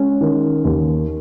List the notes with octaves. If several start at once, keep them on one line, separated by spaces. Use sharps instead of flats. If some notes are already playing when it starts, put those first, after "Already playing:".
Already playing: G#3 C#4
D#3
D#2